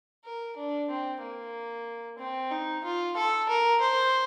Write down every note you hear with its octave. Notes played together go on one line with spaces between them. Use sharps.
A#4
D4
C4
A#3
C4
D#4
F4
A4
A#4
C5